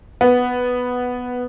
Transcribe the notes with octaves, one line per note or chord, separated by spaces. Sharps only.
B3